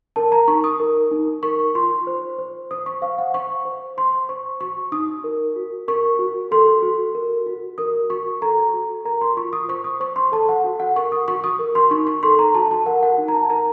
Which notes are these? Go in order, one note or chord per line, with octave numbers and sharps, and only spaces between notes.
A#4 A5
A#5
D#4 C#6
D#6
A#4
D#4
A#4 C#6
F4 C6
C5
C5
C5 D#6
C#6
C5 F5
F#5
C5 C#6
C5
C5 C6
C5 C#6
F#4 C#6
D#4 D#6
A#4
F#4
A#4 C#6
F#4
A4 C6
F#4
A#4
F#4
A#4 D#6
F#4 C#6
A4 A#5
F#4
A#4 A#5
C6
F4 C#6
D#6
C5 C#6
D#6
C5 C#6
C6
A4 A5
F#5
F#4
F#5
A#4 C#6
D#6
F#4 C#6
D#6
A#4
C6
D#4 C#6
C#6
A4 C6
A#5
F#4 A5
A5
A#4 F#5
F#5
D#4
A#5
A5
A#4 A#5